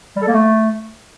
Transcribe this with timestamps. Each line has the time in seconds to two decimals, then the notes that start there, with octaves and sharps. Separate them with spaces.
0.16 G3
0.22 A4
0.28 A#3
0.33 A3